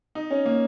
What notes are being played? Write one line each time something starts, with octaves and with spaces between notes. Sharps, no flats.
D#4
C#4
A#3